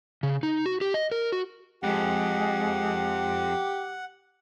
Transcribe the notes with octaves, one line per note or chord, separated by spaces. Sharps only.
C#3
D#4
F#4
G4
D#5
A#4
F#4
F2 G#3 G4 F#5